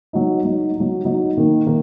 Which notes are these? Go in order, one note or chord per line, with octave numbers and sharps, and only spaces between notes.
F#3 D#4
F#3 D#4
F#3 D#4
F#3 D#4
D#3 A#3 D#4
D#3 A#3